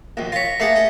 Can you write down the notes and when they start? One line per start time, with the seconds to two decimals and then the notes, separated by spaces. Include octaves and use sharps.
0.17 A#1 D#2
0.32 F4 C#5 A#6 B6
0.60 A3 A#3 G#4 F5 F#5
0.76 D#5